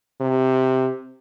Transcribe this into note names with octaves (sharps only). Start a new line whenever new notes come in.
C3